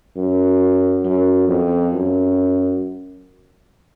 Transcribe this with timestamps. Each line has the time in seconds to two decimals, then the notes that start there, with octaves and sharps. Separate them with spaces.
0.17 F#2
1.05 F#2
1.48 F2
1.93 F#2